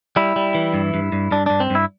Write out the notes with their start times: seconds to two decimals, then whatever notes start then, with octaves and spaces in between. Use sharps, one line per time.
0.16 G3 E4
0.36 G3
0.55 E3
0.74 G2
0.94 G2
1.12 G2
1.31 G2 D4
1.46 G2 D4
1.60 C4
1.70 G2 E4